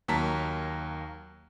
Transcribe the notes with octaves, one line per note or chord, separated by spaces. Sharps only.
D#2 F#3 A#3 A5 A#5 B6